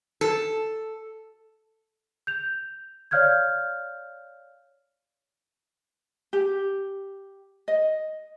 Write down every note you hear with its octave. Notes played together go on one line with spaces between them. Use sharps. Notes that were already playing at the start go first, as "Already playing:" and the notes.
A4
G6 F7
C#5 D5 F5 F6 G6 G#6
G4
D#5